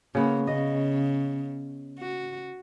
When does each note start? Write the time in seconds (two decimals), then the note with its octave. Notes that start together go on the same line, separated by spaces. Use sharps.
0.15 C#3 A#3 B3
0.47 C#3 D#5
1.99 F#4